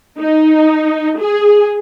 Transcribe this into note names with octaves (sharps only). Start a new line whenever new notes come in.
D#4
G#4